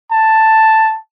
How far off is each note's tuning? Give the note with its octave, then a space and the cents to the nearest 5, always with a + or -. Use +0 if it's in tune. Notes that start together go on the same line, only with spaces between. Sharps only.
A5 +5